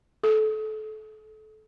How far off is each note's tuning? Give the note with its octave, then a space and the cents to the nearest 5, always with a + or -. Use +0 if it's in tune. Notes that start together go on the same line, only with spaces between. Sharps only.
A4 -25